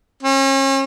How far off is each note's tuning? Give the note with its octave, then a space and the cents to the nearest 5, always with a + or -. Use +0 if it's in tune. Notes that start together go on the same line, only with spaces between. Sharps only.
C#4 -40